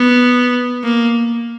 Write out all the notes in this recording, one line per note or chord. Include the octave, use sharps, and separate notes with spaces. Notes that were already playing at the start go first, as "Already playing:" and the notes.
Already playing: B3
A#3